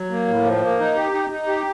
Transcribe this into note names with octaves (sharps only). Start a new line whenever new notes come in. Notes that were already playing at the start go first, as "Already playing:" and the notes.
Already playing: F#3
A#3
A2
F3
A#3
D#4
G4
D#4
D#4
G4